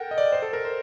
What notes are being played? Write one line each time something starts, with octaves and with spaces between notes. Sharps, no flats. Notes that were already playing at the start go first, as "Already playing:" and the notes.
Already playing: A4 A#4 F#5 G5
D#5
D5
C5
A4
A#4
C5